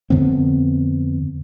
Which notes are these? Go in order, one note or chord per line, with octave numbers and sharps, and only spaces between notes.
F2 D3 B3 C4